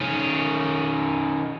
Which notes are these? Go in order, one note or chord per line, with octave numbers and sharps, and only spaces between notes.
D#3 C#4